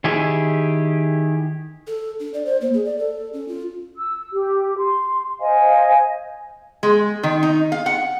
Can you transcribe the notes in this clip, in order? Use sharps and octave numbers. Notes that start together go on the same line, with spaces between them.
D#3 E4 G4 G#4
A4
D4
D5
C5
A#3
G#4
D5
A4
C#4
F4
E6
G4
C6
C5 D#5 F5 G#5
G#3
D#3
D#4
F5
F#5